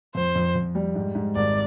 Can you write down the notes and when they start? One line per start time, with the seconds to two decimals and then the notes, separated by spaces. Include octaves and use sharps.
0.15 F2 C5
0.36 F2
0.55 F2
0.75 G3
0.95 G#2
1.15 G#2
1.36 G#1 D5